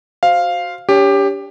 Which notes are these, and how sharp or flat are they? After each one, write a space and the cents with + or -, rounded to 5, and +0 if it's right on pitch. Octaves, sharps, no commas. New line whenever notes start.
F#4 +0 C5 +0 F5 +0
D4 -35 G4 +15 C#5 +10